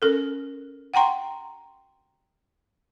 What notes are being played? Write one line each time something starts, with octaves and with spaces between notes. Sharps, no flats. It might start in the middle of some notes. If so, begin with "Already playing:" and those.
C#4 A4 A#4
F#5 G5 A#5 C6 C#6